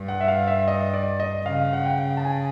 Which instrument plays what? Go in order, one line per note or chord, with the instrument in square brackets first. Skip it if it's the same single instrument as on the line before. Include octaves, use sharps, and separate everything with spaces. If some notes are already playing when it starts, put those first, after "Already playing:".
Already playing: [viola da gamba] G2
[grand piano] F#5
E5
F5
E5
D#5
D5
D#5
[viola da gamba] C#3 [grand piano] F5
[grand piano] F#5
G5
A5
G#5